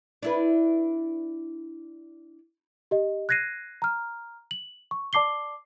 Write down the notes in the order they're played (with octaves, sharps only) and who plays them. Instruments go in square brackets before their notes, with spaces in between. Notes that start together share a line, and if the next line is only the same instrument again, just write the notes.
[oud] D4 E4 B4
[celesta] G4 D#5
F#6 G#6 A#6 C7 D#7
A#5 F6
F#7
C#6
D5 A5 D6 C7 G7